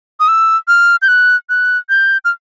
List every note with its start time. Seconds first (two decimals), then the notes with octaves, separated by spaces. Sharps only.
0.20 D#6
0.28 E6
0.68 F6
1.02 G6
1.08 F#6
1.49 F#6
1.89 G6
2.25 F6